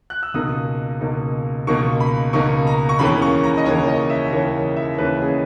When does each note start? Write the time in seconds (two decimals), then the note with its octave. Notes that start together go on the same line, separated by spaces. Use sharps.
0.10 F#6
0.23 E6
0.34 C#2 B2 A#3 D#4 D#6
1.01 C#2 B2 A#3 D#4
1.67 C#2 B2 A#3 D#4 C#6
2.00 B5
2.33 C#2 B2 A#3 D#4 C#6
2.67 A#5
2.89 C#6
2.99 D#2 C#3 E3 A#3 C#4 B5
3.22 C#6
3.43 A#5
3.57 D#5
3.66 D#2 C#3 E3 A#3 C#4 C#5
3.88 D#5
4.10 E5
4.32 D#2 C#3 E3 A#3 C#4 C#5
4.76 E5
4.98 D#2 C#3 E3 A#3 C#4 B4
5.21 G#4